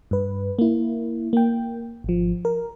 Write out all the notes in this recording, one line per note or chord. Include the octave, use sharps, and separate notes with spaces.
G2 B4
A#3 E4
A#3 G5
G#1 F3
A#4